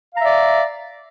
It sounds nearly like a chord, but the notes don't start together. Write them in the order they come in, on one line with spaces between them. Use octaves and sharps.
F5 A#5 E5 D5